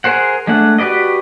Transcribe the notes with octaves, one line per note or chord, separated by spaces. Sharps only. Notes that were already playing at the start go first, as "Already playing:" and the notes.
G#4 A#4 C5 F#5
G#3 A3 D4 F#5
F#4 G4 B4 D5 D#5